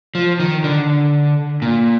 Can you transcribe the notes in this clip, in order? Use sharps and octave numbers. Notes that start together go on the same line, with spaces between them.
F3
D#3
D3
A#2